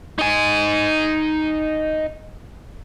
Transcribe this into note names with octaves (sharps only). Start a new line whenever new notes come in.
D#4 G#5